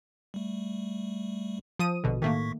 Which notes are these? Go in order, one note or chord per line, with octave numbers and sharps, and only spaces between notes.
G3 A3
F3 D#6 D#7
A#1 B2 D3
A2 D#3 A3 A#3 C#6 B6